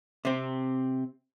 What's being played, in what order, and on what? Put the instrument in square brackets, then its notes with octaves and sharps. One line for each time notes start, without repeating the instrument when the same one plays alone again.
[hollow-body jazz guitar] C3 C4